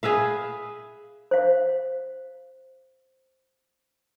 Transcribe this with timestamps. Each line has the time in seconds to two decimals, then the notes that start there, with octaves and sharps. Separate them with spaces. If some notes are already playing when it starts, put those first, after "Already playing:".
0.03 G#4 B4 E5 F5
1.31 C5 F5